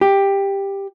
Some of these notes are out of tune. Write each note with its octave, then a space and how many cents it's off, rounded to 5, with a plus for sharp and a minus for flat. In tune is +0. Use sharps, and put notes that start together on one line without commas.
G4 +10